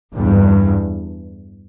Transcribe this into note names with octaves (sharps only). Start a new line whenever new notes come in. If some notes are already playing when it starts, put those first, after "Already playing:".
E2 G2